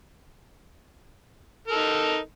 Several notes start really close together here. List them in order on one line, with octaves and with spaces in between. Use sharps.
A#4 A4 D#4